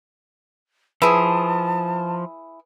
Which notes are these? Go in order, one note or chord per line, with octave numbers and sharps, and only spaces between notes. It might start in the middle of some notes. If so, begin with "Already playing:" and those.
F3 E4 G#4 B4 E5 A5 D#6